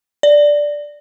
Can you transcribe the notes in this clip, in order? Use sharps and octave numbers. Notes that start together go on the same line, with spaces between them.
D5